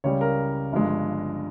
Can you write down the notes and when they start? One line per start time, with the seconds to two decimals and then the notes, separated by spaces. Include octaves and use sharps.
0.04 C#2 C#3 G3 C#5
0.21 A#4
0.73 G1 G2 F3 G#3